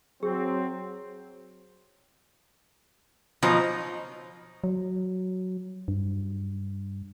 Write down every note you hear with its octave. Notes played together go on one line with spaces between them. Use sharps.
F#3 C4 G#4
B2 F3 F#3 D#4 D#5
F#3
G2